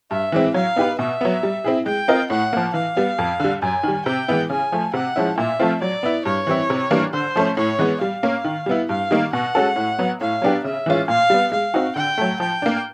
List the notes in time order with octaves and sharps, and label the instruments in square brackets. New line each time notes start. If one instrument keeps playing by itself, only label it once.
[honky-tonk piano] G2 [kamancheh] E5
[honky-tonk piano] E3 G#3 C4 E4
[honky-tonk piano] F#3 [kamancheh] F5
[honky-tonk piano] B3 D#4 G4 B4
[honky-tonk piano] B2 [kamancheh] E5
[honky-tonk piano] F#3 B3
G3
C4 E4 G#4
[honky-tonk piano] G#3 [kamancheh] G5
[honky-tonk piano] C4 F4 A#4 D#5
[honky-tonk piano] A2 [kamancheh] F#5
[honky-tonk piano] F3 A#3
[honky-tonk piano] E3 [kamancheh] F5
[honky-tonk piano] G3 B3
F2
D3 G3
[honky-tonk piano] F#2 [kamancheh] G#5
[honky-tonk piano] D#3 G3
[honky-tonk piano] C3 [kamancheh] G5
[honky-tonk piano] E3 G#3 B3 E4
[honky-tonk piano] C#3 [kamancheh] G#5
[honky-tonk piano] F3 A3
[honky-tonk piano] C3 [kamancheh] F#5
[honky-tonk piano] F3 G#3 C#4 E4
[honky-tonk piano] A#2 [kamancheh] E5
[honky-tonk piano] F3 A3 C4 F4
[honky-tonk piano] F#3 [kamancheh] D5
[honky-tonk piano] B3 E4
[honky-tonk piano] G2 [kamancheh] C#5
[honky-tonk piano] E3 G3 C4 E4
C3
E3 G3 A#3 D4
[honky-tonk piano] D3 [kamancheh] C5
[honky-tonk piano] F3 A3 C#4
[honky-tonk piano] A2 [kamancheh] C#5
[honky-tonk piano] E3 G#3 B3
[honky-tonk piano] G3 [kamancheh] F5
[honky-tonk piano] A#3 C#4
D#3
G3 B3 E4
[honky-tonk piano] G2 [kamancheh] F5
[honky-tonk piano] D#3 G3 A#3 D#4
[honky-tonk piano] B2 [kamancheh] F#5
[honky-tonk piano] G#3 C#4 F#4 A4
A2
F#3 B3
[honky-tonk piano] A2 [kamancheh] F5
[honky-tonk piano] F#3 B3 D4 G4
[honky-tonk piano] C#3 [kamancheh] E5
[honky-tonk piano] E3 G#3 C#4 F4
[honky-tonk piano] A#2 [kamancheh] F5
[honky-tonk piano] G3 B3
[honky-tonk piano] G#3 [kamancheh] F5
[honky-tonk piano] C4 D#4 F#4
[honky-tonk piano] D3 [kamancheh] G5
[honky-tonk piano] F#3 A3
[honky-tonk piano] F3 [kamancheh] G5
[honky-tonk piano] A#3 D4